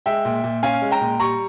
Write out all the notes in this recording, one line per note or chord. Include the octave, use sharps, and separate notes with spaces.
G#3 E5 G5
A#2
A#2
C#4 F5 G#5
G#3
G5 A#5
A#2
G3 A#5 C#6